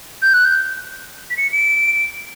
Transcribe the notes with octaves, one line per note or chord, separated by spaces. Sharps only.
G6
F#6
G6
B6
C#7
D7